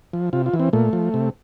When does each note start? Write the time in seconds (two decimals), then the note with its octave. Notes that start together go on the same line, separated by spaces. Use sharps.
0.13 F3
0.33 C3 F4
0.46 F4
0.54 E3
0.60 C4
0.73 A#2 A3
0.93 F3
1.14 C3